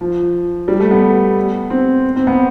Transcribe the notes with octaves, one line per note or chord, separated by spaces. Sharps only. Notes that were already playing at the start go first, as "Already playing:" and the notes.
F3
G3
A3
B3
C4
C4
B3